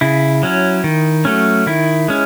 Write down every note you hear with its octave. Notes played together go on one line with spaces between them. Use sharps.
C#3 E4
F#3 C#4
D#3
F#3 A3 C#4
D#3 E4
G#3 C#4